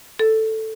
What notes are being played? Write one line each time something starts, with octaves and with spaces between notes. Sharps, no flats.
A4